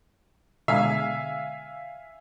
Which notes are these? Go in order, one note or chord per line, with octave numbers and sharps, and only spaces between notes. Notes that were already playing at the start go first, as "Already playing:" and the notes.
B2 D3 G#3 E5 F5 G#5